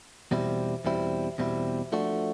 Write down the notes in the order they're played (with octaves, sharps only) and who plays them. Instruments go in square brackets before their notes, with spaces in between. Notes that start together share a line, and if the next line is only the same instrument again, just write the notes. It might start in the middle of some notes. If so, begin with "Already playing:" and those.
[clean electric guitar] E2 B2 G3 C4 E4
E2 B2 G3 C4 E4
E2 B2 G3 C4 E4
F3 A3 D4 F#4